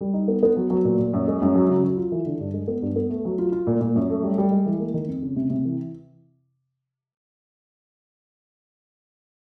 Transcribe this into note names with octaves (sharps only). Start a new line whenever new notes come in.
G3
D#4
B3
B3
F#3
F#3
A#2
A#2
F#2
G#3
F#2
F#3
C#3
F#3
F4
E3
D3
G2
G#3
B3
G2
B3
A3
F#3
F4
F4
A#2
A#2
F#2
A3
G3
G3
G#3
E3
A#3
D#3
F2
C#3
C3
C3
E3